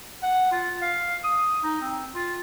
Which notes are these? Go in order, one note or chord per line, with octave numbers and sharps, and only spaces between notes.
F#5
F4
F5
D#6
D#4
C4
F4